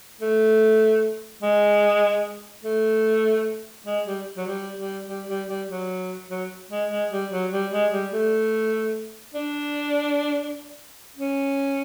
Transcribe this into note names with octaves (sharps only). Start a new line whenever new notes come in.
A3
G#3
A3
G#3
G3
F#3
G3
G3
G3
G3
G3
F#3
F#3
G#3
G#3
G3
F#3
G3
G#3
G3
A3
D4
C#4